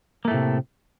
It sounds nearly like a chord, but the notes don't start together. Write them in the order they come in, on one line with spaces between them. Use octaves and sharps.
A#3 A3 A2 C3